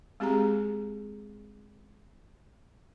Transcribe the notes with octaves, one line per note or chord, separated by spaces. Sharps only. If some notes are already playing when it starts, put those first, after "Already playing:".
G#3 C4 G4 G#4 A#5